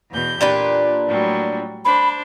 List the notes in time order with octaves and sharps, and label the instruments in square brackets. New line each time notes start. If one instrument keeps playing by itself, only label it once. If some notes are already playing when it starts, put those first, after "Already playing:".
[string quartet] E2 B2 G6
[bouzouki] A#2 D4 B4 [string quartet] G4
[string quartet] A2 F#3 G3
[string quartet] D4 C5 [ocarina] B5